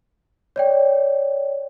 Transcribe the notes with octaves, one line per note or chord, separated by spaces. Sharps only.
C#5 D5 G5